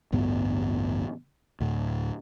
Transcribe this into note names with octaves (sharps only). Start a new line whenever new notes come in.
A1 D2 G2 B3
D2 A2